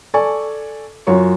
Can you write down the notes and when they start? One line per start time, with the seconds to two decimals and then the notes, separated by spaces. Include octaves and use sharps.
0.14 A4 D5 G#5 C#6
1.07 F#2 F4 F#4 C#5 C#6